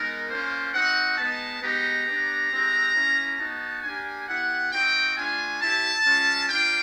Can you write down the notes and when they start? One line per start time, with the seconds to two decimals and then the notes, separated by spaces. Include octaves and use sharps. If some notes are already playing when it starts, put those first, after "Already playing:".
Already playing: G#3 B3 D#4 A#4
0.29 A#3 C#4 F4 C5
0.74 C4 D#4 F#4 F#5
1.18 G#3 B3 D#4 A5
1.62 G#3 B3 D#4 G4 A#5
2.06 B3 D4 G4
2.51 G#3 C4 E4 G4
2.95 A#3 C#4 E4
3.39 B3 D#4 F#4 A5
3.83 A#3 D4 G4 G#5
4.27 B3 E4 G4 F#5
4.72 C4 D#4 F#4 G5
5.16 A3 D4 F4 G#5
5.60 C4 E4 G4 A5
6.05 G#3 C#4 F4
6.49 A#3 D4 F4 G5